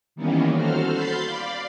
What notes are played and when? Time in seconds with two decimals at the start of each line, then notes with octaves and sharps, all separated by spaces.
0.16 D#3 E3 G3 A#3 B3 C#4
0.55 F#4 A4 C5 F6
0.91 B5 C6 G6 A6 C7
1.25 D5 F5 B5